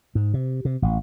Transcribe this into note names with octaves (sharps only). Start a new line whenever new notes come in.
G#2
C3
C3
A1